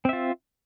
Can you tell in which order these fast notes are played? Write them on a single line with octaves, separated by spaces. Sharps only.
C4 E5 F4